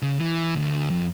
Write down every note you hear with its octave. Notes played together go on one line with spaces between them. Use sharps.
C#3
E3
D2
F2